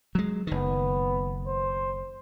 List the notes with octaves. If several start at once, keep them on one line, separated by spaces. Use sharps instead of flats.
F#3 G#3
F#1 D#3 B3
C5